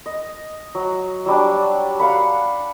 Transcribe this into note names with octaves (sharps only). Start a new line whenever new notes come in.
D#5
F#3
F#3 G3 D4
F5 F#5 B5